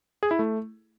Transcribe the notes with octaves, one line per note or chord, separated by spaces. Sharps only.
G#4
E4
A3